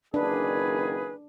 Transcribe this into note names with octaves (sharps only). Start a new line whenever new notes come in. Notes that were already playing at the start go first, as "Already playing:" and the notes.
F#1 D#3 D4 G#4 B4